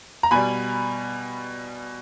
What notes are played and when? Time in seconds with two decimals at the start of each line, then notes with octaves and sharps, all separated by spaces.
0.23 A#5
0.31 B2 G3 G#5 B5